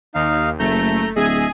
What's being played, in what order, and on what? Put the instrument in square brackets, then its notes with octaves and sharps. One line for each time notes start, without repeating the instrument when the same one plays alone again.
[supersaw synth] D#2 [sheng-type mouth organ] D#4 F5
[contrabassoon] F#1 [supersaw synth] A3 [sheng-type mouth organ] A#5 G6
[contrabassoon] D1 [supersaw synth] G#4 G#5 [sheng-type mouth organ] D#5 E5